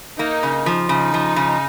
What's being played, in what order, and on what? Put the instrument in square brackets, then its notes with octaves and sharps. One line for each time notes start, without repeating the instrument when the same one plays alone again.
[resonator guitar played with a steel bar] A#3 [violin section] D#4
[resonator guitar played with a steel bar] C#3
F3
[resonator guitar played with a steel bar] C#3 [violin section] D#4
[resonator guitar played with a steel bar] F3
C#3